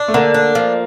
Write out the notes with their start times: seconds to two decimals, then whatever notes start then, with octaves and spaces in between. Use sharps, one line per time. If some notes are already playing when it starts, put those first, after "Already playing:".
Already playing: D4
0.08 A3
0.14 D3 A#3
0.34 D4
0.55 F3